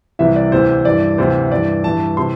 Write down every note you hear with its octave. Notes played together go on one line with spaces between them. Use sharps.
C2 C3 E3 E5
D5
D2 C3 E3 C5
G2 E3 D5
D2 C3 E3 C5
G2 E3 D5
G2 E3 A5
C3 E3 C6